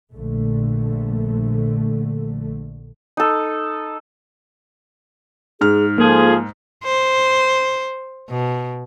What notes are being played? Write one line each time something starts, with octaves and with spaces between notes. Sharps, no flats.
A#1 D3 A3
D#4 A4
G#2 G#4 F6
F3 A#3 G#4 A4
C5
B2